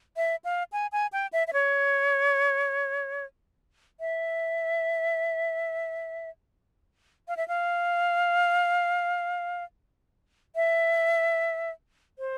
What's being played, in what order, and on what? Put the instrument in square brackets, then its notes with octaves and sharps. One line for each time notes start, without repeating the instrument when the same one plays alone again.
[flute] E5
F5
G#5
G#5
G5
E5
E5
C#5
E5
F5
E5
F5
E5
C5